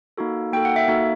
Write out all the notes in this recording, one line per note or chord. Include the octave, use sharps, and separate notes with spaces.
A#3 D#4 F#4 A4
A#3 D#4 F#4 A4 G5
F#5
E5
A#3 D#4 F#4 A4